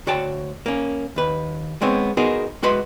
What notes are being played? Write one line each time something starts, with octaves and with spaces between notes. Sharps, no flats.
D2 F#4 C#5 G5 A5
A#3 C#4
D#2 B4
G#3 B3 C4 C#5
B3 D#4 F#4 G#4 A#4 C5
G#3 F#4 B4 C6